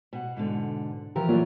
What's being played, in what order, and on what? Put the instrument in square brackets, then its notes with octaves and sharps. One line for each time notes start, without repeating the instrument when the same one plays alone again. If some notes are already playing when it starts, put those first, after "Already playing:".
[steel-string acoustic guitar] B2 F#5
G#2 B2 D3
[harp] E3 F3 [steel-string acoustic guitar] G4 A#4
[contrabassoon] A#2 [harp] F#3 A3